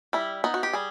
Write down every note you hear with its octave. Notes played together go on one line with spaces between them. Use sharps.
G3 E4
B3 D#4
F#4
G4
G3 G#4